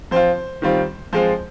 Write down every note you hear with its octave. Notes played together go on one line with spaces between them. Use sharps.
F3 C4 F4 C5
D#3 G3 C4 F4
F3 G#3 C4 F4 C5